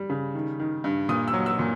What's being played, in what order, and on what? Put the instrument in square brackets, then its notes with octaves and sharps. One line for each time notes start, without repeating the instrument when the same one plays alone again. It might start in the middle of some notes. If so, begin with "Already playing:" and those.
Already playing: [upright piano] G3
C#3
D#3
D#3
G2
A#2 D#6
E6
F#3
E6
A#2